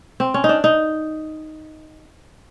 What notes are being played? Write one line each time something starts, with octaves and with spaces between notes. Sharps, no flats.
C4
C#4
D#4
D4
D#4